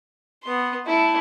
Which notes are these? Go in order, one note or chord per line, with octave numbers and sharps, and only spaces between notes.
B3 C6
A3 E4